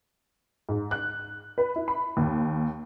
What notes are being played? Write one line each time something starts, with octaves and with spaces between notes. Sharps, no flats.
G#2
F#6
B4
E4
B5
D#2